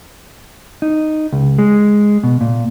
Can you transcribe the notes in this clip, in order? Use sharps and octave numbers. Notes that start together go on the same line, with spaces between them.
D#4
C#2
G#3
B2
A#2